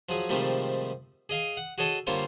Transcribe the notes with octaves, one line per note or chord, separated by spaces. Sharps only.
F3 F#3 G#4
G#2 C3 D#3 F3 G3 A3
G#4 D#5 F5 G#5
F#5
F#4 G#4 A4 C#5 D#5 A5
D3 G3 A#3 F4 C5 C#5